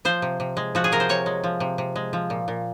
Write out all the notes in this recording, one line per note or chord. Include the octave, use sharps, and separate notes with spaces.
F3 C5
C3
C3
G#3
F3 F#4
G#4
C3 A#4
C5
C3 C#5
G#3
F3
C3
C3
G#3
F3
A#2
A#2